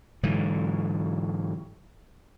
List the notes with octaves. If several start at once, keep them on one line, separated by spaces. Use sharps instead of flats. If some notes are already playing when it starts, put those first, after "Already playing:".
G#2 D3 E3 F#3